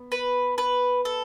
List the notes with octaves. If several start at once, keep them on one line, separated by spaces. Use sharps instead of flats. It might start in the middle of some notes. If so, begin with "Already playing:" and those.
Already playing: B3
B4
B4
A4